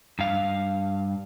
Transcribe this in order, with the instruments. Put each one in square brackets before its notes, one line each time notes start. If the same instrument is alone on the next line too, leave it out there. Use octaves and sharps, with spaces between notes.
[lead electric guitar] G2 F5